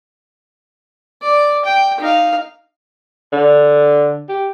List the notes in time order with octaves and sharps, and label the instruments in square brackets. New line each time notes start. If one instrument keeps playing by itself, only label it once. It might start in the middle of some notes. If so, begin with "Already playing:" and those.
[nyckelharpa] D5
G5
D#4 F5
[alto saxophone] D3
G4